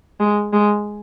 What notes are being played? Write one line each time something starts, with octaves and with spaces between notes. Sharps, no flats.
G#3
G#3